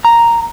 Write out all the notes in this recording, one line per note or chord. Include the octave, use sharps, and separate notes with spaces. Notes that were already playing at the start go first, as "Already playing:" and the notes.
A#5